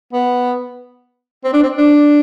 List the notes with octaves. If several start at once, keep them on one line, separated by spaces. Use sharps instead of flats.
B3
C4
D4
C4
D4